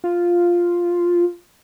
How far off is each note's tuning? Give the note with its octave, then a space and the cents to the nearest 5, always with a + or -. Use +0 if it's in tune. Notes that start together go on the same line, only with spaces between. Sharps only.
F4 +0